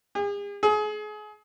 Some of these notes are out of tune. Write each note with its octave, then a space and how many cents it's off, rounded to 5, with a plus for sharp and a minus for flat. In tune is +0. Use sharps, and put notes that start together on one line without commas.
G#4 -45
G#4 +30